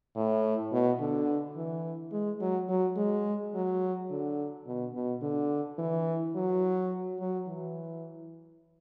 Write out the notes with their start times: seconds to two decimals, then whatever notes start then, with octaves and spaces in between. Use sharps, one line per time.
0.16 A2
0.72 B2
1.00 D3
1.56 E3
2.12 G#3
2.41 F#3
2.68 F#3
2.97 G#3
3.54 F#3
4.10 D3
4.67 B2
4.94 B2
5.22 D3
5.78 E3
6.35 F#3
7.20 F#3
7.47 E3